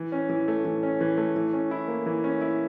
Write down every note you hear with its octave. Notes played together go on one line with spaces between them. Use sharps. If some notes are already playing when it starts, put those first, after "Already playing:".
Already playing: E3
C#4
E3
A3
E3
C#4
E3
A3
E3
C#4
E4
A#3
E3
C#4
E4